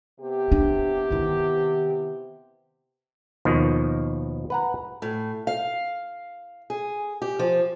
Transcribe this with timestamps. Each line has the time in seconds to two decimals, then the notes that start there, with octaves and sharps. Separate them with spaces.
0.20 C3 B3 G4
0.52 D4
1.11 D#3 E4
3.45 D#2 B2 D#3 F3
4.50 B4 F#5 A#5
5.02 A2
5.47 F5
6.70 G#4
7.22 G4
7.39 F3